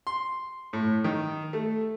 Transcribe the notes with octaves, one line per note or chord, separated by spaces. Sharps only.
C6
A2
D#3
A3